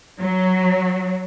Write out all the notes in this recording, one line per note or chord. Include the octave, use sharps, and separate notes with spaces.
F#3